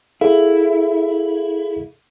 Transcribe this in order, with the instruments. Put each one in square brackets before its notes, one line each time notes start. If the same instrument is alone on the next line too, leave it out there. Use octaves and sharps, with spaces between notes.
[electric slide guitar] E4 [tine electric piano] G#4 A4 F5